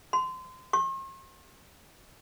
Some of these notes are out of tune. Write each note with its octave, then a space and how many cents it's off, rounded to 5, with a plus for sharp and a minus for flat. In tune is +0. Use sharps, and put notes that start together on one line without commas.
C6 -25
C6 +45